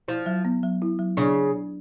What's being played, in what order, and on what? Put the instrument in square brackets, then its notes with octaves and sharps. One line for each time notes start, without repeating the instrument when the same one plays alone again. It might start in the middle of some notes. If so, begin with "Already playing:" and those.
[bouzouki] F3 [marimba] E4
[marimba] F#3
B3
F#3
E4
F#3
[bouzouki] C#3 [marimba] D4